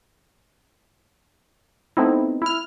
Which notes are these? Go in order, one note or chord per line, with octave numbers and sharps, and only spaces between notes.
A3 B3 C4 D#4 E4
E4 F6